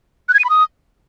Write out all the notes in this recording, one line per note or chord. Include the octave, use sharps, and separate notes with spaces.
F#6
G#6
D#7
B5
D#6